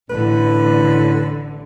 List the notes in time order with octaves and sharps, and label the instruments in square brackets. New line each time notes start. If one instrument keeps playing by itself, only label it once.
[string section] A1 D3 [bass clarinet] A2 [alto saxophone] B4